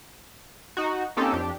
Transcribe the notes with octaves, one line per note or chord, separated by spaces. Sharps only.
D#4 F#4
A#3 C4 C#4 D#4 G4 A4
F2 D4 G4